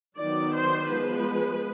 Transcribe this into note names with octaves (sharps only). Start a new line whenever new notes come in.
D#3 F#3 B3 D5
C5
F3 G#3 B3 B4